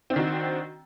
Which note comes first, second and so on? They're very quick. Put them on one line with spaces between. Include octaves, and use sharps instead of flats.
C4 D4 D#3 F#4